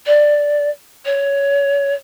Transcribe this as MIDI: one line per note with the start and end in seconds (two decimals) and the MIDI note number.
0.06 0.69 74
1.05 1.94 73